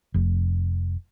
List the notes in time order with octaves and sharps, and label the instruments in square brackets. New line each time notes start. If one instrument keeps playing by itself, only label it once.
[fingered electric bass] F1